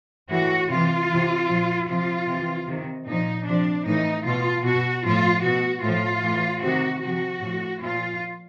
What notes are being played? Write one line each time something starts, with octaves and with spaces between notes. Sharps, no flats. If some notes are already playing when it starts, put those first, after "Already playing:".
A2 E3 F#4
C3 E3 F4
C3 E3
A#2 F3
C3 F3 F4
C3 E3
C3 D#3
A#2 F3 D#4
C3 F3 D4
A2 E3 D#4
B2 F4
B2 F#4
A2 F3 F4
B2 F#4
A2 F3 F4
A2 E3
C3 D#3 F#4
C3 F3 F#4
A2 F3
A#2 F3 F4